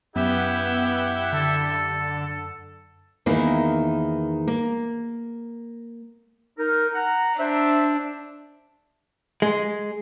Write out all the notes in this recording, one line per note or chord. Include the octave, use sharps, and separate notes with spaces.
F#2 B3 E4 G4 E5 F#5
D3 A4
E2 D#3 A#3 E4
A#3
D#4 A#4
F#5 A#5
D4 C5 E5
G#3